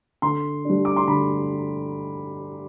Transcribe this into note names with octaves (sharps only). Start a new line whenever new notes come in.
D3 C6
G3 D4
D6
C6
D3 B5